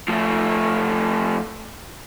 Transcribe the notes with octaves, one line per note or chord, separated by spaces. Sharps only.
F3 A3